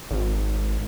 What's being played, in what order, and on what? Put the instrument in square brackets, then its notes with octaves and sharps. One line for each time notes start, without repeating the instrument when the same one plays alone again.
[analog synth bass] G#1